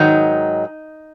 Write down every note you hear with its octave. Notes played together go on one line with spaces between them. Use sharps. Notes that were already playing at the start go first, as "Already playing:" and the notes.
Already playing: G#2 D#3 F#3 D#4